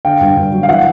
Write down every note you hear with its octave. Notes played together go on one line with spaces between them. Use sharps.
D3 F5 G5
G2
G2
F#3
F5
E3 E5 F#5